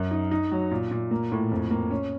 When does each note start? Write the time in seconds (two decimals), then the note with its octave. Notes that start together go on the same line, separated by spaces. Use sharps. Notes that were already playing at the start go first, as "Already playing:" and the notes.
Already playing: F#2 A#4
0.11 D#4
0.31 D#4
0.51 F#3
0.71 A#2
0.91 A#2
1.11 A#3
1.32 A2
1.51 F2
1.71 A#3
1.91 C#4